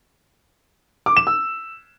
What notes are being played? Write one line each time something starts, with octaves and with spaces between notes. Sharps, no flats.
D6
E7
E6